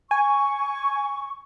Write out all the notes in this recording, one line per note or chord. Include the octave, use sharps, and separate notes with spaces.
G#5 C#6